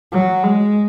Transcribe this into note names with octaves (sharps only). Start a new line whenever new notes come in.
F#3
G#3